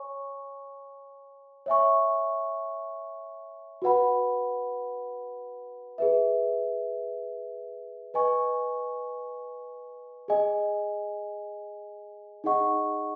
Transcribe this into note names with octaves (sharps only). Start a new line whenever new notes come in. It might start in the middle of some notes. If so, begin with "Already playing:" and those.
Already playing: C#5 G#5 C#6
C#5 E5 G#5 C#6
F#4 B4 F#5 B5
G#4 B4 E5
B4 D#5 G#5 C#6
G#4 D#5 G#5
D#4 G#4 D#5 F#5 C#6